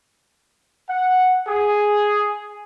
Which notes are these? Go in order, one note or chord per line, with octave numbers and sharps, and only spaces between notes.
F#5
G#4